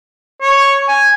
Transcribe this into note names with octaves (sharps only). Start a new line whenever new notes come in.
C#5
G#5